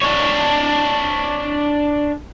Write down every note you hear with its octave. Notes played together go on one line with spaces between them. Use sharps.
D4 C#5